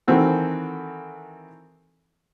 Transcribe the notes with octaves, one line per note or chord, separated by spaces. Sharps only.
D#3 E3 C4 F#4 A4